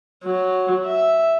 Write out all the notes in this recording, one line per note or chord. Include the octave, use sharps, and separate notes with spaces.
F#3
E5